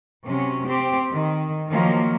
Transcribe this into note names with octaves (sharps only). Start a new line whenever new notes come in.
C3 F#3 C#4
C4 G4
D#3
D#3 F3 F#3 A#3